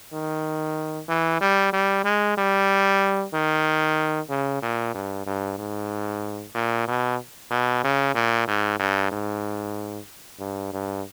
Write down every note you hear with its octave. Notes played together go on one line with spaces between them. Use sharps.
D#3
E3
G3
G3
G#3
G3
D#3
C#3
A#2
G2
G2
G#2
A#2
B2
B2
C#3
A#2
G#2
G2
G#2
G2
G2